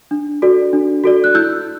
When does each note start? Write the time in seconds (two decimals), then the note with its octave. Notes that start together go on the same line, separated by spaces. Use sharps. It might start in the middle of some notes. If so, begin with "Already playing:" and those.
0.11 D4
0.42 F#4 A4 D5
0.73 D4
1.04 F#4 A4 D5
1.24 F#6
1.35 E4 E6 G6